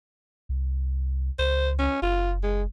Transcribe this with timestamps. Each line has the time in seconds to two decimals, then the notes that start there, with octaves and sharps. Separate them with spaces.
0.49 C2
1.39 C#2 C5
1.79 C#4
2.02 F#1 F4
2.43 G#3